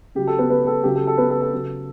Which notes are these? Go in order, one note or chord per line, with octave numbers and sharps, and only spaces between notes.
C#3 F#3 G4
A4
B3 B4
B3 B4
A4
C#3 F#3 G4
A4
A4
B3 B4
A4
A4
C#3 F#3